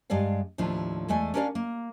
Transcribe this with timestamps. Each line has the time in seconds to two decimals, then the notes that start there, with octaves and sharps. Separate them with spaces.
0.10 G2 G#3 G#4 D5 F5
0.58 D#2 A2 F3 D4
1.08 E2 G#3 A3 D5 G#5
1.34 C#4 D4 A#4 C#5 D5 F5
1.55 A#3